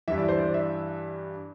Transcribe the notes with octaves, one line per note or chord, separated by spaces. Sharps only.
G2 E3 E5
D5
C5
D5
E5